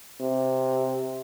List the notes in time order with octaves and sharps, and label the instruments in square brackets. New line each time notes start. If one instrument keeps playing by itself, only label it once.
[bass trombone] C3